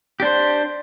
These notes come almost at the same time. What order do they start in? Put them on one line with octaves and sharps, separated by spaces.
G4 D4 C5